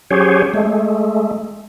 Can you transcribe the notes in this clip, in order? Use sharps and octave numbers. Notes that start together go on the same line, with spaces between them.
F#3 C#4 G4 G#4 C5 C#5
G#3 A3